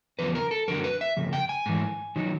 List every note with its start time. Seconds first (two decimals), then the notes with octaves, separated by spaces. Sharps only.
0.19 E2 C#3 F3 B4
0.35 A#4
0.51 A4
0.68 F#2 D3 F#3 A#4
0.84 B4
1.01 E5
1.17 F2 C#3
1.33 G5
1.49 G#5
1.66 G#2 E3
2.16 D#3 F#3